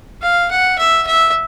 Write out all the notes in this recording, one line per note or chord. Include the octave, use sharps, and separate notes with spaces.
F5
F#5
E5
E5